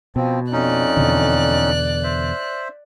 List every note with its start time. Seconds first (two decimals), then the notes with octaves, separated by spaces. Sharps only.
0.16 B2 F3 C4
0.52 F2 C#4 D#4 D5 F#6
0.97 E2 B2 D3
2.04 C5 E5